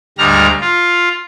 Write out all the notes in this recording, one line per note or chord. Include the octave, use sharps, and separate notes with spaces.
D2 G#2 G3 A#5 F6
F4